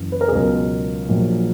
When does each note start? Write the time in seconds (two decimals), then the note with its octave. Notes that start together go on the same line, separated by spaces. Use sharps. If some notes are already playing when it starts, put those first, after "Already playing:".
Already playing: F#1 F#2 E3
0.12 B4
0.21 A#4
0.28 G#4
0.32 C#2 B2 F#3 A#4
1.09 A#1 A#2 F#3